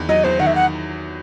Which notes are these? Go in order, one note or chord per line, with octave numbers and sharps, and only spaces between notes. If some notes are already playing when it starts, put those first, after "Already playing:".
Already playing: E2 D#3
F#3 D#5
E2 C5
D#3 F#5
E5
F#5